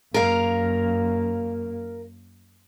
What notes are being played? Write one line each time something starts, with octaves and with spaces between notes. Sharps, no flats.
F#2 A#3 A#4 F5